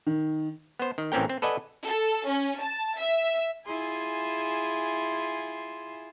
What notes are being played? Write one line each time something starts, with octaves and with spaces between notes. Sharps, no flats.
D#3
B3 C5
D#3
A1 E3 C4 C#4 A#4 G5
C4
A4 B4 D5 D#5 F#5 G#5
A4
C#4
A5
E5
E4 F4 G#4 G#5 C6